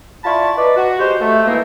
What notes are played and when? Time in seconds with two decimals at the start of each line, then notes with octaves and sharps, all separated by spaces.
0.24 E4 F4 D5 A5 B5 C#6
0.57 D#4 B4 D5
0.76 F#4
0.99 G#3 D#4 F#4 G4 C5
1.21 A3
1.46 D#3 E3 G#3 A#3 C4 D#4